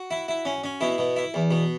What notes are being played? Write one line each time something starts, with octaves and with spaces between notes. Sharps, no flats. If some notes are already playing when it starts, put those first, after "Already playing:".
Already playing: F#4
E4
E4
C#4
C#4
B2 E4
B2
E4
E2
B2